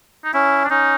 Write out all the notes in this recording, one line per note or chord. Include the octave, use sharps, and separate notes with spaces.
D#4
C#4 E4
D4
C#4 D#4